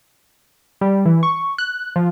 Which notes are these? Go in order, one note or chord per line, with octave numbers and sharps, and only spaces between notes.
G3
E3
C#6
F#6
F3